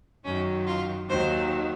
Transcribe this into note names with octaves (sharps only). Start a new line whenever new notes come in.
F#2 D#3 F#3 C#4
F4
D#2 D#3 F#3 C5